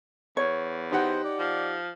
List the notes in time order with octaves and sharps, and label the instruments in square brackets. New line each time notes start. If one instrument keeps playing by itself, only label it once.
[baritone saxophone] E2 [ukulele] C#5
[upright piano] D#4 G4 F#5 [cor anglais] C5
[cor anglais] D5
[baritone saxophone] F3